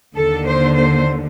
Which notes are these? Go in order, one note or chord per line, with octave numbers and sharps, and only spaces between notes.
D#2 D3 A4
C5
C5